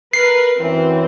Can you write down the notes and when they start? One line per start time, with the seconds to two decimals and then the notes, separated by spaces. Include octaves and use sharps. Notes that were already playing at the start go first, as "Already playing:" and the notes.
0.13 A#4 B4 C7
0.59 F#2 E3 C4